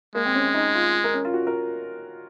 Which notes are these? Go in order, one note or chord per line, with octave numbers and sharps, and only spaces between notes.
G#3 A#3
C4
C#4
C#4
D#4
F4
A#4
C#4
F4
F#4
A#4